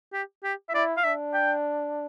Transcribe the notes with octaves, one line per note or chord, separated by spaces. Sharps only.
G4
G4
E5
E4 D5
F5
D4 E5
G5